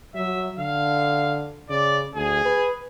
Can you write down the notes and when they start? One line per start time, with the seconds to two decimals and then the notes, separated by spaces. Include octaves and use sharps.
0.15 F#3 E5
0.58 D3 F5
1.70 C#3 D5
2.15 D2 G#4
2.45 B4